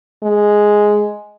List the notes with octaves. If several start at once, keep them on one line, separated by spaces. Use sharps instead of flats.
G#3